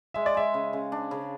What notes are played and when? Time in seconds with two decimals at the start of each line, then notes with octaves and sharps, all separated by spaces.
0.14 G#3 E5
0.26 D5
0.35 G#3 E5
0.54 C#3
0.73 C#3
0.92 D4
1.11 C#3